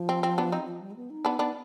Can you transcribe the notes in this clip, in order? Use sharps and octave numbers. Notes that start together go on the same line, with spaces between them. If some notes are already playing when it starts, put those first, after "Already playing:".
Already playing: F3
C4
C4
B3 D4
C4 D#4
F3
G3
G#3
B3
D#4
B3 D4
B3 D4